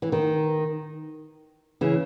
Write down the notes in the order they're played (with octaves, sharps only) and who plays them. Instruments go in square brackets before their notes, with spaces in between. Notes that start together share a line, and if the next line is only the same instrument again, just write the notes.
[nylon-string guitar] E3
D#3
C#3 E3